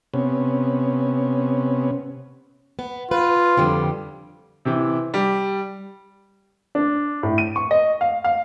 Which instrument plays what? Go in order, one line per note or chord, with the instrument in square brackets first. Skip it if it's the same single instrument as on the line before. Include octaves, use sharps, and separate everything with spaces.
[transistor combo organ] C3 B3 C#4
[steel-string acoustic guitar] B3
[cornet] F4 [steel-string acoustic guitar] B4
[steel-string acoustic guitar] F2 D3 G3
[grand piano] C3 E3
G3
[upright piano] D4
A2
D#7
C#6
D#5
F5
F5